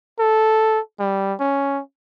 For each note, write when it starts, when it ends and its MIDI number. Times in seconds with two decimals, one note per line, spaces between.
0.19 0.79 69
0.99 1.34 55
1.40 1.81 61